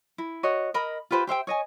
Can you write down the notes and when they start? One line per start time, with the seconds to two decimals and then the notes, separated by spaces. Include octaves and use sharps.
0.18 E4
0.43 F#4 C#5 D#5
0.74 A#4 D#5 B5
1.11 F4 G4 B4 C5
1.27 G4 C5 E5 G5
1.47 C#5 D#5 G#5